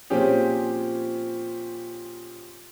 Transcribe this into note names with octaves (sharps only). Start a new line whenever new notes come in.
A#2 F3 C4 C#4 G4 G#4